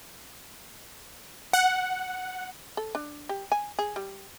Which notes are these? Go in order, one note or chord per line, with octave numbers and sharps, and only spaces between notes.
F#5
A4
D4
G4
G#5
G#4
G3